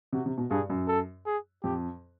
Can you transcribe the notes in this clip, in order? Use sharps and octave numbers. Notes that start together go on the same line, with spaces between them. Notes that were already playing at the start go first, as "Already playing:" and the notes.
C3 F#4
C3
B2
G2 G#4
F#2
A4
G#4
F2 G4